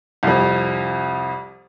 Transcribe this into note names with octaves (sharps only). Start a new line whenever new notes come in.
C2 F2